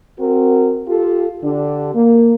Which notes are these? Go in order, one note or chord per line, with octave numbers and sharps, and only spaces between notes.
C4 F#4 A#4
F4 G4 A4
D3 D4 G4
A#3